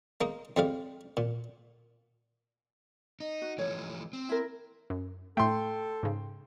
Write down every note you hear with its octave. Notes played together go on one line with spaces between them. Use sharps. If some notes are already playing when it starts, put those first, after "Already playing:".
G#3 A#3 D#4
F2 G3 G#3 F5
A#2
D#4
F#4
E3 F3 A3 C#5
C4
E4 A#4
F#2
A2 A3 A4 G5 C6
G#2 C#3